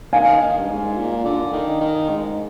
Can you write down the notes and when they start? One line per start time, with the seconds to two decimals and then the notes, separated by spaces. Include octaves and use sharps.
0.13 D#3 F5 G#5
0.41 D#3
0.58 G2
0.69 G#2
0.97 A#2
1.25 D3
1.53 D#3
1.81 D#3
2.09 G#2